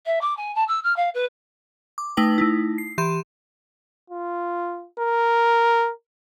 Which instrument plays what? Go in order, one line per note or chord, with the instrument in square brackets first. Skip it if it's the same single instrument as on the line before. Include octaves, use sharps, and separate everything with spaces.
[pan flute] E5
D6
G#5
A5
E6
F6
F5
B4
[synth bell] D6
A3 D#4 B4 G5 F#7
A3 D#4 E4
C7
E3 G4 C6 D#7 E7
[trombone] F4
A#4